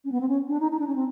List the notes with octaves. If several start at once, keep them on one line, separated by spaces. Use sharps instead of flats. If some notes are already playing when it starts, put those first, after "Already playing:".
C#4
B3
C4
C#4
D4
D#4
D#4
D4
C#4
C4